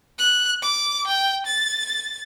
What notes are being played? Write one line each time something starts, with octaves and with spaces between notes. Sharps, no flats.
F#6
D6
G5
A6